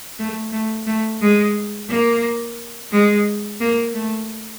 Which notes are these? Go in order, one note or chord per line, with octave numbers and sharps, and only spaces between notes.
A3
A3
A3
G#3
A#3
G#3
A#3
A3